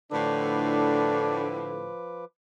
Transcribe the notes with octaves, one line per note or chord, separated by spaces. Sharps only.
A2 D3 F3 D4 B4 D6